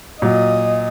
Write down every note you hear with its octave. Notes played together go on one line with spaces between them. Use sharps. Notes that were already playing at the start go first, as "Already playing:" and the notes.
A#2 F#3 D#5